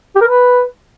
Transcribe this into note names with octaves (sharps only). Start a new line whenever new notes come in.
G4
A#4
B4